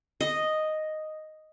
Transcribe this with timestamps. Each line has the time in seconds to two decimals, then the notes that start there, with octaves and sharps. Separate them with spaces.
0.21 D#5